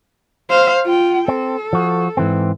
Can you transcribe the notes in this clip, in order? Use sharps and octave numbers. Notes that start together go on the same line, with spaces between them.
C5 F5
F4 G5
C4 A4
F3 F#4
G#2 E3 C4